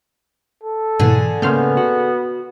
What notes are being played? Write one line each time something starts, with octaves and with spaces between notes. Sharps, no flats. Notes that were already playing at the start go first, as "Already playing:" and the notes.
A4
G#2 B2 D3 E3 G#4
A2 C#3 A#3 B3 C6 F6 G6
F#4